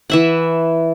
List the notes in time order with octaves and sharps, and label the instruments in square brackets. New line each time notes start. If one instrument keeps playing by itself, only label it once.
[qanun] E3 E5 F#5